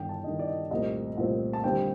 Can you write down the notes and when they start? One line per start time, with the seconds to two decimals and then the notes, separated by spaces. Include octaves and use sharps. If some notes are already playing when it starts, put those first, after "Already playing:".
Already playing: G1 G2 D#3 G5
0.09 A5
0.24 G1 G2 D#3 D#5
0.39 D5
0.47 D#5
0.71 C2 A#2 A3 C4 D#5
1.17 C2 A#2 A3 C4
1.53 A5
1.64 D#2 D3 G3 C4 G5